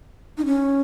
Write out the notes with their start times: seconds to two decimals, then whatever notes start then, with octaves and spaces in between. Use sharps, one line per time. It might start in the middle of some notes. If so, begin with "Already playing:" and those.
0.38 D#4
0.45 C#4